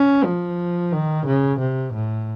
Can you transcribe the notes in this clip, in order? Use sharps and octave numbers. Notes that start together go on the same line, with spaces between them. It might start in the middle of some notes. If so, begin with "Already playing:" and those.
Already playing: C#4
F3
D#3
C#3
C3
A2